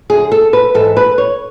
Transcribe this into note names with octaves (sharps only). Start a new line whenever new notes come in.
F#2 D3 G#4
A4
B4
G#2 E3 A4
B4
C#5